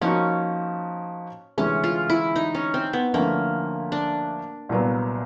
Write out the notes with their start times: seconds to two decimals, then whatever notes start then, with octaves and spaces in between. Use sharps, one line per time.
0.01 F3 A#3 C#4 D#4 F#4
1.58 D2 C3 E3 G#3 C#4
1.84 F4
2.10 E4
2.36 D#4
2.55 C#4
2.74 C4
2.93 B3
3.13 D2 D3 F3 A3 A#3 C#4
3.92 D4
4.69 C2 A#2 F#3 B3